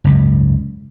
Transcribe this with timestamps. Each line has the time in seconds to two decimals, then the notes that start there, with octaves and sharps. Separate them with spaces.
0.04 F#1 C#2 G#2